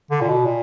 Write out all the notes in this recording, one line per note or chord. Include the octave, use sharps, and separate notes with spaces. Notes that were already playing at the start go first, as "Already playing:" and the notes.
D3
A#2
B2
A#2